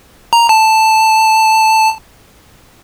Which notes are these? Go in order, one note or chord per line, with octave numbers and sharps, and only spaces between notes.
A#5
A5